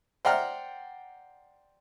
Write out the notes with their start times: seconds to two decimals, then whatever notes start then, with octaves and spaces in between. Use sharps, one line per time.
0.25 C5 D5 F#5 G5 A#5 F6